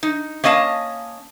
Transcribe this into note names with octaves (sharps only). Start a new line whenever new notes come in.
D#4
A#3 C#4 D#5 F5 A5